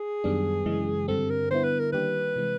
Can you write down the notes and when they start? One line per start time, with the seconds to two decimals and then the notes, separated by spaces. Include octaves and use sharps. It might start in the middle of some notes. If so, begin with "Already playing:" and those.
Already playing: G#4
0.24 F#2 D#3 G3 B3 D4
0.66 F#2 C#3 E3 G#3
1.08 G2 D3 G3 C4 A4
1.30 A#4
1.50 D3 G3 B3 E4 C5
1.64 B4
1.80 A#4
1.93 D#3 G3 A#3 D4 G4 B4
2.36 C3 E3 G#3 C4